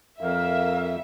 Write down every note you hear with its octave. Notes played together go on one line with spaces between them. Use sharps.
F2 A#4 E5 F5